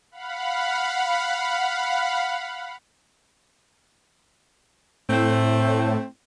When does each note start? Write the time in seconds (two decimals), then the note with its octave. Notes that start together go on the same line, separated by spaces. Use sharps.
0.11 F5 F#5 B5
5.09 A2 A3 C4